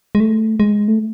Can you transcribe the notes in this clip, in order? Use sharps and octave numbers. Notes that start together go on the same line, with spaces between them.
G#3
A3
G#3
A3